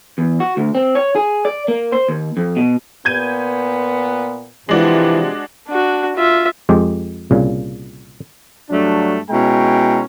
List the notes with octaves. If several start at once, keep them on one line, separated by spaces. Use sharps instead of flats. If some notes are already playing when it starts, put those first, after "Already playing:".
E2
F#4
D2
C4
C#5
G#4
D5
A#3
C5
D#2
F2
B2
A#2 B3 G6 G#6 D#7
C3 E3 F3 G#3 D4 F#4
D4 F#4
F4 E5
F2 G#3 G4
C2 A#2 C#3
G2 F#3 A3 D4
B2 G#3 C#4 E4 G5 A#5